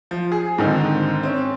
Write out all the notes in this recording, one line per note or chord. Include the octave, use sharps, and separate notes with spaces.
F3
G#4
G#2 D3 D#3 C4 D#4
C4 C#4